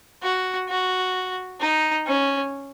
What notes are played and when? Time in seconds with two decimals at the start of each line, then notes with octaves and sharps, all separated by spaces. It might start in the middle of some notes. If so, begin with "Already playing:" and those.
0.23 F#4
0.69 F#4
1.60 D#4
2.06 C#4